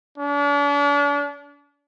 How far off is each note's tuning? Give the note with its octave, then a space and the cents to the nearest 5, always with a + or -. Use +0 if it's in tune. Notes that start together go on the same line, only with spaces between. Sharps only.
D4 -40